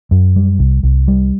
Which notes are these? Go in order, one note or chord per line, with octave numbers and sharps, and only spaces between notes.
F#2
G3
C2
C2
G3